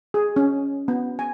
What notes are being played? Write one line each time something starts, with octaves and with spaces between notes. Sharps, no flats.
G#4
C#4
B3
G#5